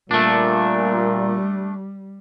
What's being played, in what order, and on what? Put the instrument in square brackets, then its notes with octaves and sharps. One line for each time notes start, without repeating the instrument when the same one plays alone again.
[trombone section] A#2 [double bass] G3 [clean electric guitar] A3 D4